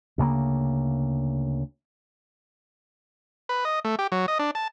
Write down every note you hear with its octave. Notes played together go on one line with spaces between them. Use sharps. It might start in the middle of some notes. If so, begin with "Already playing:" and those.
D2 C#3 A3 A#3
B4
D#5
A3
G4
F#3
D#5
D4
A5